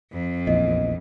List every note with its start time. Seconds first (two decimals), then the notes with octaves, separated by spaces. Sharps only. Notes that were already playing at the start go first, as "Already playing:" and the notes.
0.12 F2
0.47 A#1 E2 A#2 D#5